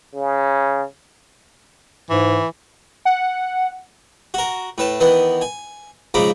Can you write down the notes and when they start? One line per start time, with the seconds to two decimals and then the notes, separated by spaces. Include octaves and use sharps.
0.14 C#3
2.10 G#2 E3
3.05 F#5
4.34 F#4 A#4
4.78 A2 B4 A5
5.00 D#3 E3 B3
5.41 G#5
6.14 G#2 C#3 F3 A#5 B5 D6